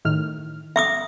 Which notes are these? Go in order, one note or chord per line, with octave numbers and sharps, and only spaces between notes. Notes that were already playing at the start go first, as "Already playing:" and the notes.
A2 D#3 F6
E5 D6 D#6